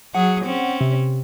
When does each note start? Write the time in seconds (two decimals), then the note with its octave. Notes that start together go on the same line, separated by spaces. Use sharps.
0.15 F#3 G#4 F#5
0.45 C4 C#4
0.81 C3